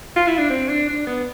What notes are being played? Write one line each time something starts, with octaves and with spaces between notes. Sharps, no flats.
F4
E4
D4
C4
D4
D4
B3